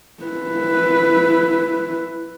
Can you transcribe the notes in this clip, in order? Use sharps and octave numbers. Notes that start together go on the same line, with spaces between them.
E4 B4